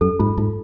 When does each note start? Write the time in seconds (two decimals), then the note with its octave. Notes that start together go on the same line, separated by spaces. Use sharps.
0.01 F#2 A4
0.19 G#2 F4
0.37 G#2 F4